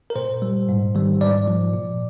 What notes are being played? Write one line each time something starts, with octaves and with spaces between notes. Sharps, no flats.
A#4
A#2 C5
G3
G#2
D#3 G3
G#2 D5
F3
A#2